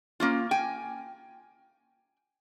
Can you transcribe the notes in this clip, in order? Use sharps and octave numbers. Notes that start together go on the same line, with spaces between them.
A#3 C#4 F4
G5 G#5